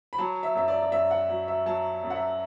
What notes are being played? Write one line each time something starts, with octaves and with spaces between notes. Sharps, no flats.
B5
F#3 A5
E5
F#2 E5
D5
D5
F#2 E5
F#5
F#3
E5
F#3 A5
F#2
F#5
E5